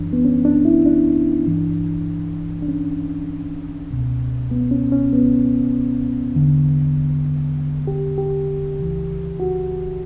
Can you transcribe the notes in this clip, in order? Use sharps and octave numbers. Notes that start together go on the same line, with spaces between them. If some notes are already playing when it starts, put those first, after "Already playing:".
Already playing: F#2 E3 D4
B3
C#4
D4
E4
D4
G2 E3
D4
C#4
C#2 B2
B3
C#4
C#4
B3
E2 D3
G4
G4
C#2 C#3 E3
F#4